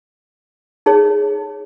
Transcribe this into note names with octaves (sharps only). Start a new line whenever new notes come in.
D#4 G#4 C#5